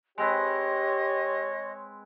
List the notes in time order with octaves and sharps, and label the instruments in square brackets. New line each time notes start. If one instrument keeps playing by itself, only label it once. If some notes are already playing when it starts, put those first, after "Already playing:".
[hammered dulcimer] G#3 C4 B4 [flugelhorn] G4 [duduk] C#5 [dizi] D#5